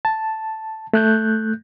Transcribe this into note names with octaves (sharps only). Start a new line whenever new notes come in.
A5
A3 F#6 G6